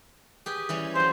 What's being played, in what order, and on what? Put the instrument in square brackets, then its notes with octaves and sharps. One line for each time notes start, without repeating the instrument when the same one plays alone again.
[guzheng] G4 G#4 B4
E3 G3 C#4
[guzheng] F#3 F4 [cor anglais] C5